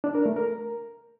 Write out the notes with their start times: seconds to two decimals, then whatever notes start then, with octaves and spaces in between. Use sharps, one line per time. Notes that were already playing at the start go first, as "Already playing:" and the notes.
0.04 D4
0.15 A#4
0.26 A3
0.36 A#4